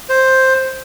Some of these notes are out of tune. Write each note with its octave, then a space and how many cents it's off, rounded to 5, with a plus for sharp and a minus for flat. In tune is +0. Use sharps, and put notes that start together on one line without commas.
C5 +5